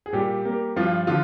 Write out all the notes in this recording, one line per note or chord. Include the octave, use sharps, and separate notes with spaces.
G#4
A#2 G3 G4
G3 A#3
G2 F3 F4
D3 F3 F4